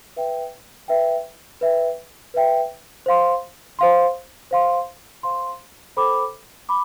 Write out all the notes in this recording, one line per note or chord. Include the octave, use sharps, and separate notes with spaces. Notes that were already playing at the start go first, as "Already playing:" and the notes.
B4 E5 G5
B4 E5 G5
B4 E5 G5
B4 E5 G5
C5 F5 C6
C5 F5 C6
C5 F5 C6
C5 F5 C6
A4 C5 G5 B5 D6
B5 D6